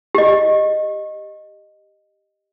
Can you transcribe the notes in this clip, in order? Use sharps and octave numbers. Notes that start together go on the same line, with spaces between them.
G4 D#5